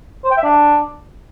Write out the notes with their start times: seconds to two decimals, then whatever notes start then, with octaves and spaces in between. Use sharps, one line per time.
0.24 C5
0.31 G5
0.37 E5
0.44 D4